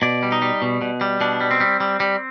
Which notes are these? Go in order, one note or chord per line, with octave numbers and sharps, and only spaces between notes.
B2 D5
G3
D#4
G3
B2
B2
G3
B2 D4
G3
C4
G3
G3
G3